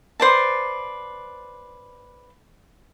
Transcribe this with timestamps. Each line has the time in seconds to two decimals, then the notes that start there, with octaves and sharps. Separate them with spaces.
0.20 B4 C5 D5 A5